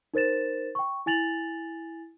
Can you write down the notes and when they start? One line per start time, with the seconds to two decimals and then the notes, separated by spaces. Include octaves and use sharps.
0.14 D#4 A#4 C5 A6 E7
0.75 G5 C#6
1.06 E4 G#5 A6 F7 F#7